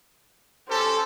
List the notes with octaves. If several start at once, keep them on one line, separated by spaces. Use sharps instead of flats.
C#4 G4 A4 C5